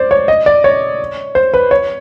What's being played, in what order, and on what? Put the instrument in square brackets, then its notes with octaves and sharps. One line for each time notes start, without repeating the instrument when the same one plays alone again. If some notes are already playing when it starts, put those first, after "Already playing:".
Already playing: [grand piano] C5 D5
C#5
D#5
D5
C#5
C5
B4
C#5